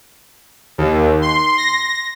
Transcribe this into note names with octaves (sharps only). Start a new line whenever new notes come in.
D#2
C6
A#6